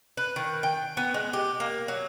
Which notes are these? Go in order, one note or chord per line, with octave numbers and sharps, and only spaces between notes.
B4
D#3
G5
B3
G#3
G4
A#3
F#3